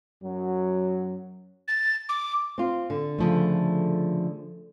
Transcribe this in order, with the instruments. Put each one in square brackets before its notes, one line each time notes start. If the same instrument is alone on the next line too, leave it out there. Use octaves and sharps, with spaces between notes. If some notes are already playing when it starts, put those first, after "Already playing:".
[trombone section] F#2 F#3
[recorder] A6
D6
[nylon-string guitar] C4 F4
D3
[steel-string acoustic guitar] C#3 F3 A3